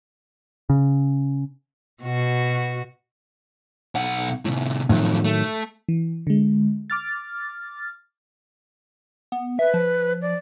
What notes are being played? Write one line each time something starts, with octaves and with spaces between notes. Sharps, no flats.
C#3
B2 F#4
B1 F#5
A2 C3
F#2 A2 D#3 F3 F#3
A3
E3
D3 G#3
D6 F6 A6
B3
B4 E5
F3
D5